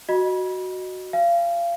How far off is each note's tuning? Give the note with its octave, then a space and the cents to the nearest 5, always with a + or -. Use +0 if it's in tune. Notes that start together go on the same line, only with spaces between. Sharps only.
F#4 +0 D#5 -15 B5 -35
F5 -30 G#5 +0